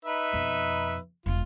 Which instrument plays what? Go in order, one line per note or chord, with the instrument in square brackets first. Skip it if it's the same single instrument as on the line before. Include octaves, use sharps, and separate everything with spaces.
[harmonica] D#4 B4 E5
[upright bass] F2 B2
[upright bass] E1 G#3 [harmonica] F4